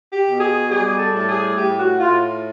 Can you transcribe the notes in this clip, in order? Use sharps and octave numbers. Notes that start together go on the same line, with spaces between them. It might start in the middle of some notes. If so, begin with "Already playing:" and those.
G4
B2
G#4
G3 G#4
A4
A2 A4
G#4
A2 G4
F#4
A2 F4